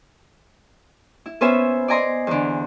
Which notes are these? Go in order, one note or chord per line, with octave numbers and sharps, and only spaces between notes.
E4
B3 C#4 B4 C5 E5 G#5
D5 D#5 G#5 A#5 C6 D#6
E2 D3